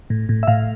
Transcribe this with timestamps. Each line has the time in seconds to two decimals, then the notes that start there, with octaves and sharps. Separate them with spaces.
0.10 A2
0.29 A2
0.43 E5
0.47 A2 F5